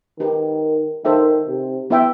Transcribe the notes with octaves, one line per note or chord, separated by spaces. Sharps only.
D#3 D#4 G4 B4
D#3 D#4 A4 C5 E5 G5
C3
B3 E4 B4 E5 G5